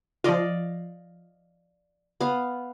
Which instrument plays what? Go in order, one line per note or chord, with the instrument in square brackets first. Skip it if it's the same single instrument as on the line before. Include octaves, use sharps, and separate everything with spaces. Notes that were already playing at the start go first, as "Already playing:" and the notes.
[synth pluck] F3 F4 [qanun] D5 D#5 F5
[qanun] B3 F5